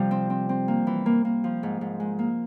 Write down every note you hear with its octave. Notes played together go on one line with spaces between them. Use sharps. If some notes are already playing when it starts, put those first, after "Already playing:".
Already playing: C3 F3 G3
C4
C4
C4
A#3
E3
A#3
A#3
F3
G#2
G#2
G#3
A#3